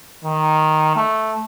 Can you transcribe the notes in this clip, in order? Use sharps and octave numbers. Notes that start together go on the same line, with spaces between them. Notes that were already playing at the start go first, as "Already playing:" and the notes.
D#3
A3